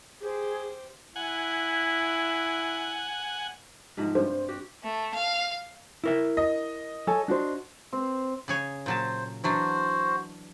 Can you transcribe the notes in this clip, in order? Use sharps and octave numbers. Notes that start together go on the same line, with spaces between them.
G4 G#4 C5
E4 F#5 G#5
G#2 C3 F3
G2 C5
F#4 G4
A3
F5
E4 A#4 E5
D#5
A4 C#5 G#5
D4 F#4 C5
C4
C#3 G#4 C#5
A#2 F#3 C5 A5
E3 F#3 D4 F#4 C5